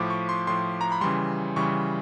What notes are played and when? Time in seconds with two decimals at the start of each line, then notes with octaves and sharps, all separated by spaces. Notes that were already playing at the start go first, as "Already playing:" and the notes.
Already playing: A2 F3 D6
0.10 C#6
0.29 C6
0.47 A2 F3 C6
0.81 A#5
0.92 B5
1.01 C#3 E3 G3 C6
1.56 C#3 E3 G3 C#6